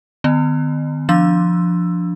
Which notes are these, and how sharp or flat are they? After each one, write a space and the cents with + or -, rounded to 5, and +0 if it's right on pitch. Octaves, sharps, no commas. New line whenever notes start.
D#3 -40 B3 +30
F3 +0 D4 +0 E6 +10